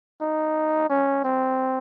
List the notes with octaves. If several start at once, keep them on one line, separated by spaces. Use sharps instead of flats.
D#4
C#4
C4